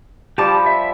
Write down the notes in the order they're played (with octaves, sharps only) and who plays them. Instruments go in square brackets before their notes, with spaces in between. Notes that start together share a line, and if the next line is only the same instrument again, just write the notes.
[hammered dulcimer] F3 G3 [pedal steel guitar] G4 A5 D6
[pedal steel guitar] E5